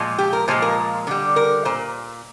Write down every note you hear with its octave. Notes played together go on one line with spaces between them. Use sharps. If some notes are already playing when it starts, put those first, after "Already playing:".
Already playing: A#2 F3 G#3
G4
A#4
A#2 F3 G#3 C5
A#4
D3 G3
A#4
A#2 C5